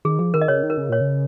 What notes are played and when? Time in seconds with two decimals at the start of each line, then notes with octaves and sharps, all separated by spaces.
0.05 D#3 G#4
0.19 F3 G#4
0.34 D#3 A#4
0.41 D#5
0.48 C#3 C#5
0.63 D#3
0.70 A#4
0.77 C#3
0.89 A#2 C#5
1.01 C#3